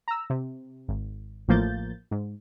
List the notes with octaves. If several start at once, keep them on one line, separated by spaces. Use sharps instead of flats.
A#5 E6
C3
G#1
A1 A2 F3 A#3 G6 A6
G#2